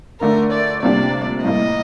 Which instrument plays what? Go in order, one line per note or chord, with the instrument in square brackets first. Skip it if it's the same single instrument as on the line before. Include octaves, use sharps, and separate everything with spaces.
[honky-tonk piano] D3 A3 D4 [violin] A#4
[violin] D5
[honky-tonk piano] C3 G3 A#3 D4 G4 [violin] D5
[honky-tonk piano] A2 G3 A#3 [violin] D#5